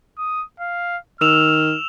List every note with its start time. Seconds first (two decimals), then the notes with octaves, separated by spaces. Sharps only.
0.18 D#6
0.61 F5
1.21 D#3 E6 F6 E7 F7